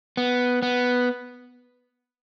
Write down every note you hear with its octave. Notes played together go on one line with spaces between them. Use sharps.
B3
B3